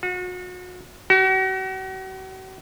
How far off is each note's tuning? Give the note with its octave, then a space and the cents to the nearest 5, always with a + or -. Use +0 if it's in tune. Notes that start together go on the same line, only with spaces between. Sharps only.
F#4 -35
F#4 +40